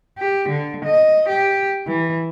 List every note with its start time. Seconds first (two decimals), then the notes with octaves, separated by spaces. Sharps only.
0.18 G4
0.49 D3
0.85 D#5
1.28 G4
1.87 E3